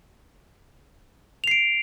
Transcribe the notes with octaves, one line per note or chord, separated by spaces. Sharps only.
C7 D7 F7